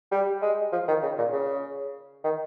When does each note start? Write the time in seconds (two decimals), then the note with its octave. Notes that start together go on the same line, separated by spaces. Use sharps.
0.11 G3
0.42 G#3
0.72 F3
0.88 D#3
1.03 C#3
1.18 A#2
1.33 C#3
2.24 D#3